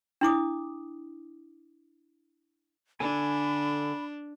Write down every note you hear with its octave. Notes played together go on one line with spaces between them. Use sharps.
D4 E4 D6 D#6
D3 D4 A4 G#5 B5